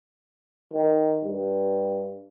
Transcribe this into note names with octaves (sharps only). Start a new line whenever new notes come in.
D#3
G2